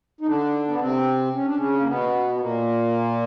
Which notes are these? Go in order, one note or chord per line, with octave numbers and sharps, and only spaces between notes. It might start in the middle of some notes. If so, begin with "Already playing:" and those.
D#4
D3 D4
B3
C3 C4
C#4
D4
C#3 C#4
A#3
B2 B3
B3
A#2 A#3